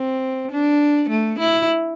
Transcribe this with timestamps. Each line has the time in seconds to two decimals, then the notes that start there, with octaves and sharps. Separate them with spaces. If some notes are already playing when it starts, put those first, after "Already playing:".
Already playing: C4
0.51 D4
1.10 A3
1.39 E4